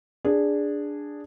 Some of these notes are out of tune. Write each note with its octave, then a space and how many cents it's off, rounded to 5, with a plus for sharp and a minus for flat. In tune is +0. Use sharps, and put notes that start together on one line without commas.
D4 +0 G#4 -10